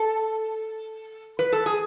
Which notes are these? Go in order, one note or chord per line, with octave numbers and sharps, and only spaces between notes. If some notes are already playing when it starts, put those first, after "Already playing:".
Already playing: A4
B4
A4
G#4